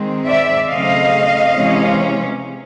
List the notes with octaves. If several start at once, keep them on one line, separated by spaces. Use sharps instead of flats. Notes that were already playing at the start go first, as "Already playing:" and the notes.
Already playing: D#3 G#3 C4
D5 E5
C#3 F#3 A3 C4 D#5 F5
C3 E3 G#3 C#4